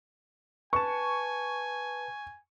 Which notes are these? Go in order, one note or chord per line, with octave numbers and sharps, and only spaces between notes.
B4 G#5 A5 C#6